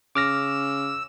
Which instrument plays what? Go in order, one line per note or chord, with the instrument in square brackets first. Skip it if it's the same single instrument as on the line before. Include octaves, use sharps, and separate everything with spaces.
[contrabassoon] C#3 [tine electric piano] D6 F6 A#6 [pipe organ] E6